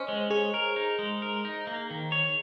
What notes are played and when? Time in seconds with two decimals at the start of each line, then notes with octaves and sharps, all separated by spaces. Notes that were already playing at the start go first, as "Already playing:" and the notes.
Already playing: C#4 C5 D#5
0.08 G#3
0.30 G#4 C#5
0.54 A#4
0.76 D#4
0.99 G#3
1.22 A#4
1.45 D#4
1.67 A#3
1.90 D#3
2.12 C#5